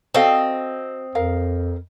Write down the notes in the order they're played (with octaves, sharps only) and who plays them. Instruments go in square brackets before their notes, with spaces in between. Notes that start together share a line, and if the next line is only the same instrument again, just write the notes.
[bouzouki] C4 D#5 [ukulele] F#4 A4 F5
[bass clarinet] F2 [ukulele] A#4 F5